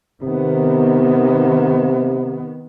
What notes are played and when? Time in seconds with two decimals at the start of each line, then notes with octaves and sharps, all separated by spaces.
0.23 C3 D#3 B3